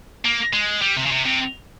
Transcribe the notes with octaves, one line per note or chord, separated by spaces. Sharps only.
A#3
G#3
G3
C3
C#3
C3
C3